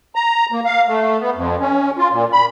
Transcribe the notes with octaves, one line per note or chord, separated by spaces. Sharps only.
A#5
A#3
F5
A3
B3
F2
C#4
F4
A#2
B5